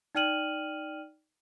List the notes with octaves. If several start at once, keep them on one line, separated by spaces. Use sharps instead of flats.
D#4 D5 G5 F6 D#7 F#7